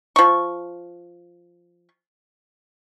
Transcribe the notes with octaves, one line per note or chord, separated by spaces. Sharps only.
F3 C#6